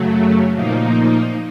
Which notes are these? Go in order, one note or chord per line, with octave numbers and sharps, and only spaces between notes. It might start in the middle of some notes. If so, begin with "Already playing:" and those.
Already playing: F#2 C#3 F#3 A3
A#2 F3 A#3 D#4